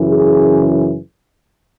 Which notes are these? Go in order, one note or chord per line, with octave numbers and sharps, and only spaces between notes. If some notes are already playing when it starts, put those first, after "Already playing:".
Already playing: F#2 C#3 E3
G#4